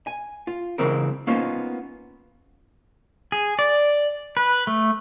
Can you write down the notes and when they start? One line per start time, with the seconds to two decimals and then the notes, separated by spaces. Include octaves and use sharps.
0.07 G#5
0.47 F4
0.78 C#3 E3 G#3 C4 A#4
1.27 A#3 B3 C#4 D#4 F4 C5
3.32 G#4
3.59 D5
4.37 B4
4.67 A3